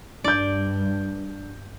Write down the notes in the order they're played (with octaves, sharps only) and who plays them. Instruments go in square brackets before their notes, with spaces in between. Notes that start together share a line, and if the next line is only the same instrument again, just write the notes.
[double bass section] G2 [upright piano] D4 G6 [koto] D5